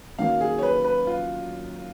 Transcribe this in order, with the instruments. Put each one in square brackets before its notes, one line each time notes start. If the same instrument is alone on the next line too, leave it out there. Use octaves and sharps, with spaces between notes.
[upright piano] F#2 D#3 F#3 A#3 [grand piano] F5
[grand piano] G#4
C#5
B4
B4
F4